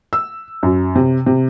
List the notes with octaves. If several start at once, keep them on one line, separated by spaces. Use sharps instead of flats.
E6
F#2
C3
C3